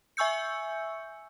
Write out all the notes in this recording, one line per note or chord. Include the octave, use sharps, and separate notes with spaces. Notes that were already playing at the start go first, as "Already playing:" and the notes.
E5 G#5 C#6 E6 G6 C#7